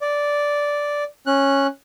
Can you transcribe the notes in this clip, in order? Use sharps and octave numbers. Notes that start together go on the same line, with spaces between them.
D5
C#4 F#6